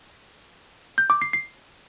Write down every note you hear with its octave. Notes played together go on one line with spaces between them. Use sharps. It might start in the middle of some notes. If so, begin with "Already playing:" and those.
G6
D6
C7
C7